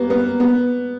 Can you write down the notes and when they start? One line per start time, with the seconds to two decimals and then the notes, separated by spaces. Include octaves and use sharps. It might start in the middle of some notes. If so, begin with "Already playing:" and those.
Already playing: G3 A#3 B3
0.10 B3
0.40 B3